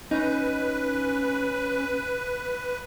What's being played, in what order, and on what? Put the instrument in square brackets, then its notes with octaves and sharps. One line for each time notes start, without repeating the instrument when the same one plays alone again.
[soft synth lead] C#4 [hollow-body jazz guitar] D#4 [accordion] B4